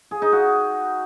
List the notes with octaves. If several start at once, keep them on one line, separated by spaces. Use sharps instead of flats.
G#4
D#4
F#4